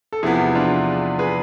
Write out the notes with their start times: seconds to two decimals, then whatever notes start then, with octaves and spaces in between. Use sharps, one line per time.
0.12 A4
0.23 E2 C3 F3 B3 E4 G#4
0.55 D4 F4
1.19 G#4 B4